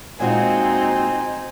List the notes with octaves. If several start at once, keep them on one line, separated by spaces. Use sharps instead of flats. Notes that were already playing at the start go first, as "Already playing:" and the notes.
A#2 G#3 C4 D#4 F#4 G#5